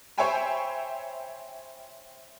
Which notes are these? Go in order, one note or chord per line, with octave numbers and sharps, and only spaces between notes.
C5 C#5 E5 G5 G#5 B5